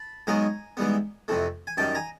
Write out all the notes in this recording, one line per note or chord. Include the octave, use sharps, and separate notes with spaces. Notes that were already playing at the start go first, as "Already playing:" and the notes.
Already playing: A5 B5
G#2 D#3 F#3 B3 G#5 A#5
G#2 E3 G3 B3
F2 C3 E3 A3
G#5
F#2 D#3 G3 G5 A5
G#5 A#5